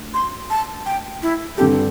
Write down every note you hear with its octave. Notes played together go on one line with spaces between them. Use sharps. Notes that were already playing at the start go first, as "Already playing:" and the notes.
Already playing: D2
C6
A5
G5
E4
G2 D3 C4 G4 A4